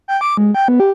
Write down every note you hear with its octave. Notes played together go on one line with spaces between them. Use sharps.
G5
D6
G#3
G5
B3
G4